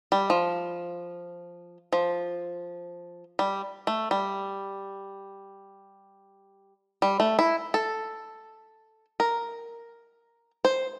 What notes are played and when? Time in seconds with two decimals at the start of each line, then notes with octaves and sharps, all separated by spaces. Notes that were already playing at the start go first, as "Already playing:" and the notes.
0.12 G3
0.30 F3
1.93 F3
3.39 G3
3.87 A3
4.11 G3
7.02 G3
7.20 A3
7.39 E4
7.74 A4
9.20 A#4
10.65 C5